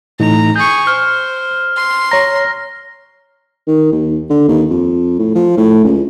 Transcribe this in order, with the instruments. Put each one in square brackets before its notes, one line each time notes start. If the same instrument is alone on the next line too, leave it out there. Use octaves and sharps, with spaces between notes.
[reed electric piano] A2 E3 D#4 [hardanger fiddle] A#5
[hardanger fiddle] G#4 C#6 [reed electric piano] G6
[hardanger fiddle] C5 [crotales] F6
[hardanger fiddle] C6
[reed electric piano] C#5 A#5 [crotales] A#6
[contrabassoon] D#3
D#2
D3
D#2
F2
A2
F3
A2
C#2